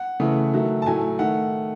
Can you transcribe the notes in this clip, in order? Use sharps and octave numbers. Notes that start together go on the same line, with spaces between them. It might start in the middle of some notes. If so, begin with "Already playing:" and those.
Already playing: F#5
C#3 E3 A3
D#3 F#3 A3
A5
A2 F#3 A3 G#5
D#3 A3 F#5